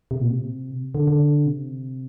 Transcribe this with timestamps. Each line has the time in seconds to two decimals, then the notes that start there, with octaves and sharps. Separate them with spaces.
0.11 C3
0.21 A#2
0.30 C3
0.95 D3
1.07 D3
1.46 C3